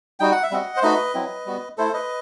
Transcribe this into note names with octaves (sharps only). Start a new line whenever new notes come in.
G3 D#4 F#4 G5
F#5
E5
G3 C4 F#4 D#5 F#5
C5
A3 D#4 F#4 B4 D#5
F#3 C4 E4
G3 B3 F#4
A3 E4 A4 C5
B4 D#5